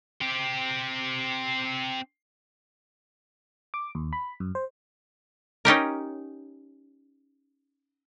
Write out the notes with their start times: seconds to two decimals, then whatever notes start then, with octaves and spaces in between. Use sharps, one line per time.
0.21 C4 G4
3.74 D6
3.95 D#2
4.13 B5
4.40 F#2
4.55 C5
5.65 C#4 D#4 G4 A#4